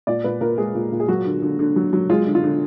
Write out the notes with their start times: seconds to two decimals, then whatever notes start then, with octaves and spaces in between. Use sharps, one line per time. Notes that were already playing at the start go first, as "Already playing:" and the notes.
0.07 A#2 D5
0.24 A#2 B4
0.41 A#2 A#4
0.58 G#3 G#4
0.75 A#2
0.92 A#2
1.00 G#4
1.08 F#3 F#4
1.25 D3
1.42 D3
1.59 D3
1.76 F#3
1.93 F#3
2.10 G#3 F4
2.26 D3
2.35 F4
2.43 D3